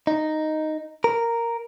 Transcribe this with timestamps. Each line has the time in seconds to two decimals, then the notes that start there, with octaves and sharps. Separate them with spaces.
0.07 D#4
1.04 A#4